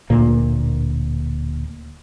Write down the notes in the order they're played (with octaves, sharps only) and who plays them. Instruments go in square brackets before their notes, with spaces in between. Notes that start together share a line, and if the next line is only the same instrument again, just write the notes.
[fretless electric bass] D1 D2 A#2 A#3